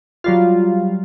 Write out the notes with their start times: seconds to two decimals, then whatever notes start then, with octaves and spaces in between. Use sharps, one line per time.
0.24 F#3 G3 F4